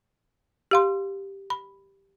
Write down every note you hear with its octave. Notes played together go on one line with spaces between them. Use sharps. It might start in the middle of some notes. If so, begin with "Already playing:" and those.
G4 F5 C6
B5